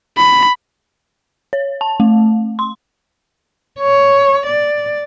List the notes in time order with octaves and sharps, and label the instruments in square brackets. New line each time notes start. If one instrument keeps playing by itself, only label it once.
[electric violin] B5
[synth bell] C#5
A5
A3
C6
[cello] C#5
D5